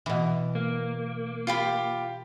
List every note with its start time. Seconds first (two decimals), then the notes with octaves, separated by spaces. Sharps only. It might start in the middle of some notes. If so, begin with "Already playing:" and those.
0.06 B2 E3
0.55 A#3
1.47 F4 G4 B5